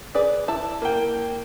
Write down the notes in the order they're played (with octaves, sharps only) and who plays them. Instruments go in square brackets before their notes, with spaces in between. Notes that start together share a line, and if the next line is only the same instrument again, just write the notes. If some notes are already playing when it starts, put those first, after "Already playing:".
[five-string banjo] G#4 B4 D5
[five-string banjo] E4 [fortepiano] A5
[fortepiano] A#3 G5